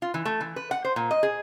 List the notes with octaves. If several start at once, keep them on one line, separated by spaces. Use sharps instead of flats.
F4
E3
A3
E3
B4
F#5
C5
A#2
D#5
G#4